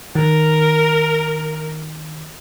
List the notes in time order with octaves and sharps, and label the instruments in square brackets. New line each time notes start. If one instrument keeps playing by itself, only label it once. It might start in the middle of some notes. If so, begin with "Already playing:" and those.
[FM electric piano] D#3 [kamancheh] A#4